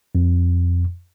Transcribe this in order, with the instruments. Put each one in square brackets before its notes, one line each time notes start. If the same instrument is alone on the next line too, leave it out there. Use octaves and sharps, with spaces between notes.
[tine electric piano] F2